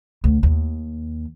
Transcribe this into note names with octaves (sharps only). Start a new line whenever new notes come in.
D2
D#2